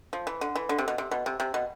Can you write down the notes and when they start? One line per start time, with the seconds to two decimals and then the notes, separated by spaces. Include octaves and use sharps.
0.13 F3
0.27 E3
0.41 D3
0.55 E3
0.69 D3
0.78 C3
0.88 B2
0.98 C3
1.11 B2
1.26 C3
1.40 C3
1.54 B2